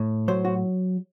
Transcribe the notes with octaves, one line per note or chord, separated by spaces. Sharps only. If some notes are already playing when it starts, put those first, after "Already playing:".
Already playing: A2
F#3 C5
F#4